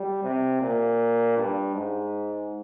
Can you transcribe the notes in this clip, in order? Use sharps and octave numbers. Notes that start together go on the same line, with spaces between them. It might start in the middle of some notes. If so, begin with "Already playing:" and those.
Already playing: G3
C3
A#2
G2
G#2